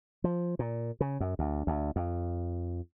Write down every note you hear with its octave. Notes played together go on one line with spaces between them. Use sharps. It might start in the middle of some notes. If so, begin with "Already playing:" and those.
F3
A#2
C#3
F#2
D2
D2
F2